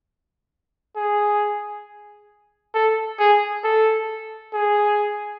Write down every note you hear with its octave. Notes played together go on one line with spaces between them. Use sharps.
G#4
A4
G#4
A4
G#4